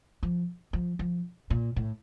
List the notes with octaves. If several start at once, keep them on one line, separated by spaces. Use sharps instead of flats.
F3
F3
F3
A#2
A2